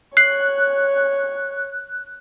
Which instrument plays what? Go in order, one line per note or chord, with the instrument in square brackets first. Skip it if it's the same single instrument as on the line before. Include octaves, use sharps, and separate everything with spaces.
[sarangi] C#5 [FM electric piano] F#6 [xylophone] C7